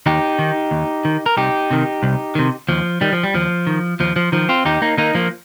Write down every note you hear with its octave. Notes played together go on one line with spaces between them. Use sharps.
D#2 D#4 G4
D#3
D#2
D#3
A#4
C2 D#4 G4
C3 D#3
C2
C3 D#3
D#2 F3
D#3 G3
F3
G3
D#2 F3
D#3
D#2 F3
F3
D#3 F3
C4 F4
D#2 D#4 G4
A#3 D#4
D#3 A#3 D#4
F3 A#3